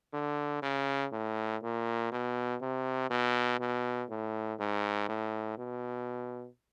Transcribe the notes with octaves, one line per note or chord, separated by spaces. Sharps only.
D3
C#3
A2
A#2
B2
C3
B2
B2
A2
G#2
A2
B2